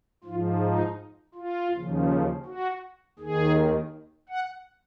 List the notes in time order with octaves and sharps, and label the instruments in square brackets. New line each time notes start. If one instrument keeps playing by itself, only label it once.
[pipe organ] G#2 F3 F4
D#4
F4
D#2 C#3 F3
F#4
D#2 D#3 G#4
F#5